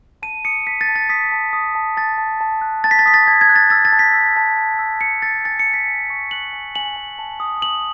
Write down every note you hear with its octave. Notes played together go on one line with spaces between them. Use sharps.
A5 D#7
D#6 C#7
A5 B6
A6
A5
A6
D#6 B6
A5
D#6
A5
A5 A6
A5
A5
F#6
A5 A6
B6
A6
D#6 B6
A6
A5 G#6
G#6
F#6
A6
E6 A6
A6
A5
B6
E6
A5
A5
E6
A5 C#7
E6 A6
G#5 A6
C#7
G#5
B6
G#5
C#6
F#6 F#7
G#5
G#5 F#7
G#5
A5
D#6
D#6 F#7